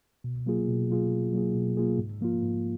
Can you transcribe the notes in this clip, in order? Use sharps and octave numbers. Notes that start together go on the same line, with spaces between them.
B2
F#3 A#3 F4 G#4
B2
F#3 A#3 F4 G#4
B2
F#3 A#3 F4 G#4
B2
F#3 A#3 F4 G#4
G#2
F3 A#3 F4
G#2